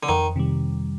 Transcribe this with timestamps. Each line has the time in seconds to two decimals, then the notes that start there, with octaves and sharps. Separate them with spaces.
0.03 D3
0.09 F2 D#3
0.36 C3 D#3 G3